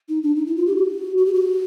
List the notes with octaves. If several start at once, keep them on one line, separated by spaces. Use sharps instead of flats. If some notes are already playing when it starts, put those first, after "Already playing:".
D#4
D4
D#4
E4
F4
G4
F#4
F#4
G4
F#4